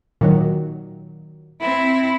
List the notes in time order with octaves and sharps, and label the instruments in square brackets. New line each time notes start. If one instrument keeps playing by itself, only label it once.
[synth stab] A#2 D#3 F#3
[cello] C4 E4